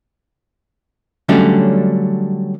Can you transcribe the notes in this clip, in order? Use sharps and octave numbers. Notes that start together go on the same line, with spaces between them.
D3 F#3 G3 A3 C#4 D4